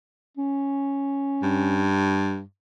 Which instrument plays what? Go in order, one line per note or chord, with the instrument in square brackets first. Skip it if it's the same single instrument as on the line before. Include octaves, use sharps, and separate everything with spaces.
[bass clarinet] C#4
[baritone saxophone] G2